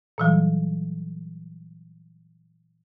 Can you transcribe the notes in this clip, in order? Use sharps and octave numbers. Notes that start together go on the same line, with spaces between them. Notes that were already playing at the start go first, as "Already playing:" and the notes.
A#2 E3 F#3 G3